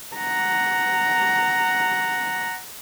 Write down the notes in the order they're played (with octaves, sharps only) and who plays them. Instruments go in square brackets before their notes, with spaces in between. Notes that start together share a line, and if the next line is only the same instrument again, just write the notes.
[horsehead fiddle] F#5 A#5